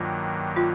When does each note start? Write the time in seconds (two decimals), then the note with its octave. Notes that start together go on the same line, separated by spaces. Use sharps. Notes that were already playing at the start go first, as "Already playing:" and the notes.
Already playing: G2 D#3 F#3 A#3 F4
0.56 F4